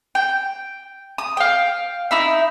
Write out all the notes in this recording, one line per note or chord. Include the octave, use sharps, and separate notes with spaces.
G5
D#6
F5 G5
D#4 E4 E5